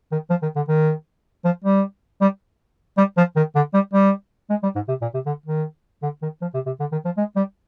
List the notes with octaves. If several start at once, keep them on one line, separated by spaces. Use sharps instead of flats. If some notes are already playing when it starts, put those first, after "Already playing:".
D#3
F3
D#3
D3
D#3
F3
G3
G3
G3
F3
D#3
D3
G3
G3
G#3
G3
G#2
C3
A#2
C3
D3
D#3
D3
D#3
F3
C3
C3
D3
D#3
F3
G#3
G3